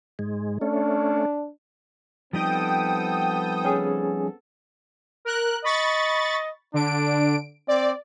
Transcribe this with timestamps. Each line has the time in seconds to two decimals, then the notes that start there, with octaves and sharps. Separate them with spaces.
0.19 G#2 G#3
0.61 A3 C#4 D4
2.33 F3 G3 B3 C4 D#4 A4 G5 D#6
3.65 C#4 G#4
5.25 A#4 F#6
5.64 D#5 B5 C#6 A6
6.74 D3 D4 D7
7.68 C4 D5